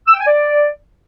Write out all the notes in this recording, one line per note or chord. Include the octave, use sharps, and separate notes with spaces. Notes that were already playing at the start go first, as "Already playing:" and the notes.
E6
G5
G#5
D5